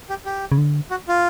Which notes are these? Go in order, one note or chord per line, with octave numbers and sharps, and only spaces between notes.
G4
G4
C#3
D3
F#4
F4